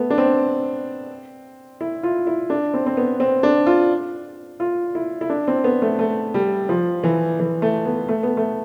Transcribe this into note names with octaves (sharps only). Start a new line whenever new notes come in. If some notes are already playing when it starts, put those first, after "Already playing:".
Already playing: A3 B3
D4
C4
E4
F4
E4
D4
C4
C4
B3
C4
D4
F4
F4
E4
E4
D4
C4
B3
A3
A3
G3
F3
E3
E3
A3
B3
A3
B3
A3